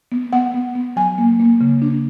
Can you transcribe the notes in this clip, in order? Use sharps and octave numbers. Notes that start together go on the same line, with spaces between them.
B3
B3 F#5
B3
B3
F#3 G#5
A#3
A#3
C#3
D4